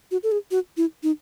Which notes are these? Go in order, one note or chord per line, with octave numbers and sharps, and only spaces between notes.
F#4
A4
G#4
F#4
E4
D#4